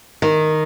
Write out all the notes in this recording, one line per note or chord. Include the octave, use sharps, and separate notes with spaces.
D#3